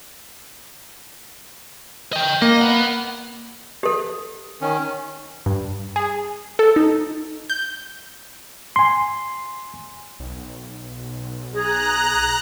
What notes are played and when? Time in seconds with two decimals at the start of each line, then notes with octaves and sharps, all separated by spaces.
2.13 D#5 G5
2.42 A#3 D#5
2.61 B4 F#5
3.83 G4 A4
4.61 D#3 C#4
5.46 G2
5.96 G#4
6.59 A4
6.76 D#4
7.50 G6
8.76 G#5 C6
10.20 B1
11.52 G#4 A#5 F#6